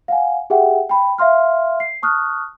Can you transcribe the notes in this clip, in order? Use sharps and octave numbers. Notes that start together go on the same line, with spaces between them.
F5 F#5 G#5
G4 G#4 E5 F#5 G5
G5 B5
E5 F5 C6 F6
C7
A5 C#6 D#6 F6 F#6